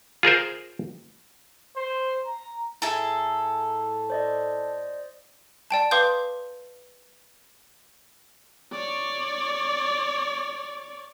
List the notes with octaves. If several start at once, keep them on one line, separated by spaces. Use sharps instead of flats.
F4 G#4 A#4 C5
C5
A#5
A2 G#4 A4 E5 G#5 A#5
C5 D5 D#5
D5 G5 A5
B4 F5 C6 D6 D#6 G6
C#5 D5